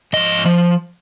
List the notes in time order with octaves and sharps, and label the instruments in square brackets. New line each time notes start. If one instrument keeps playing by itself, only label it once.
[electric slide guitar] G#2 F3 D#5
F3